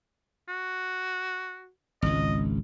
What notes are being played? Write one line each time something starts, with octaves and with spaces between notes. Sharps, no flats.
F#4
G#1 C#2 D#5